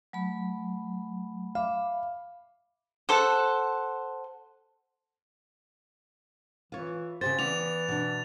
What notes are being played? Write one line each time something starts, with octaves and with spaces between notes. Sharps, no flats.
F#3 A3 B5
E5 F5 B5 D6
A4 C5 F#5
E3 F4 C#5
C#3 G4 C5 A6
E3 B3 B4 D5 F7
B2 D4